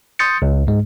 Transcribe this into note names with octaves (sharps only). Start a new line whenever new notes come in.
C6 D#6 G6 A6 C#7
C#2
G#2 G#3